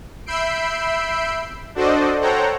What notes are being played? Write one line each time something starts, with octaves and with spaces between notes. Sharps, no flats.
E5 B5 E6 G6 C7 D7
D4 F#4 A4 C5 D5 D#5
A4 C5 C#5 F#5 G5 A#5